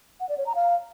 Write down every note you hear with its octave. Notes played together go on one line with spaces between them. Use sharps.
F#5
D5
C#5
A#5
F5